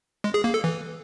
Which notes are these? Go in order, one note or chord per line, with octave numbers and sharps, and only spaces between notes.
G#3
G#4
A#3
A4
E3